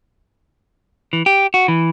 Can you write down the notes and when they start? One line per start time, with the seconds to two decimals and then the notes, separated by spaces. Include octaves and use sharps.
1.13 E3
1.26 G4
1.54 F#4
1.68 E3